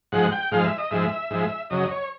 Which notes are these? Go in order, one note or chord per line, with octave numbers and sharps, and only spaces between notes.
G#2 F3 G#3 F#5
G5
G#2 F3 G#3 F5
E5
D#5
G#2 F3 G#3 E5
G#2 F3 G#3
F#2 C#3 F#3 D#5
C#5